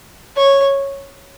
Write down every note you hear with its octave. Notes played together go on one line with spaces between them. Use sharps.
C#5